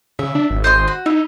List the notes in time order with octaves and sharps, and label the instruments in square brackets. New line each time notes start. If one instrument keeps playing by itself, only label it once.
[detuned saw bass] C#3 [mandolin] E5
[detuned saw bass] D4
G#1
[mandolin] C5 D#5 C6
F#4
[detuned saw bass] D#4 [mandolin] E4